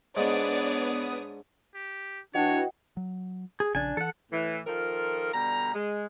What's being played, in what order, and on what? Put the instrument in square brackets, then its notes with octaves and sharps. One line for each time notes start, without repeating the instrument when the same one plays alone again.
[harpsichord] G#2 [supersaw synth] B3 D#6 [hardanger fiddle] D4 C#5 [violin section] D5
[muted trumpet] G4
[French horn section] E3 F#4 [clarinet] D4 [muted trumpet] C#5 [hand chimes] D#5 F#5 G5
[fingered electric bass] F#3
[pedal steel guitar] G#4
[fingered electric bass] A#1 C#3 [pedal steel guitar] D4 G#5
[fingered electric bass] E3 [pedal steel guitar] A4 F#5
[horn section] A2 E3
D#3 F3 F4 A4 A#4
B2 D3 G3 A#5
G#3